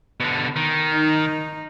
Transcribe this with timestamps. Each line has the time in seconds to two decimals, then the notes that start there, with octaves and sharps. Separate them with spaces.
0.20 B2 D3
0.56 D#3
0.94 D#4